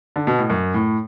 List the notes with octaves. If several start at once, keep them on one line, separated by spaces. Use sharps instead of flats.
D3
B2
A2
F#2
A2